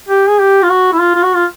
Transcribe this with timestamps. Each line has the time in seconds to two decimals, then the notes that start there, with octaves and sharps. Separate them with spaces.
0.09 G4
0.29 G#4
0.40 G4
0.63 F4
0.69 F#4
0.93 E4
1.00 F4
1.15 F4
1.23 F#4
1.34 F4